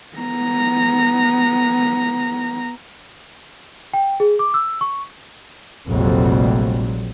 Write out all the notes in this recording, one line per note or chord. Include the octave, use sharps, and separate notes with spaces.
B3 A#5
G5
G#4
D6
E6
C#6
F1 A#1 F2 F#3 G3 C4